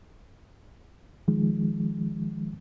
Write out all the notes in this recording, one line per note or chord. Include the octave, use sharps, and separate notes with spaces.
D#3 F3 G#3